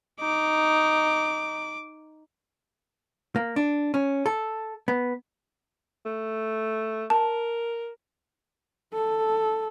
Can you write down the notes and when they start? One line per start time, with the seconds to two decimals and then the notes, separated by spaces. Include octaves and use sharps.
0.21 D#4 D6
3.36 A#3
3.56 D4
3.94 C#4
4.26 A4
4.88 B3
6.06 A3
7.10 A#4 A5
8.94 A4